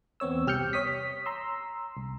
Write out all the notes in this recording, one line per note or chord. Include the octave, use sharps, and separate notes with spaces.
E2 B3 C4 C#5 E6
C2 G4 F6 G6 C#7
C#5 D#6 B6
A#5 C6 E6
C2